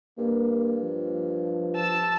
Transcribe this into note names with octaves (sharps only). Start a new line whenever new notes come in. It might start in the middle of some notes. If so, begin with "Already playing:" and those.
G2 A#3
F3
A5 E6